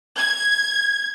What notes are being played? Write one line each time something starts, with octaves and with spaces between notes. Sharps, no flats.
G#6